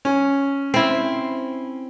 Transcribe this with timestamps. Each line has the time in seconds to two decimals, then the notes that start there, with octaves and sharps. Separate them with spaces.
0.05 C#4
0.74 C4 E4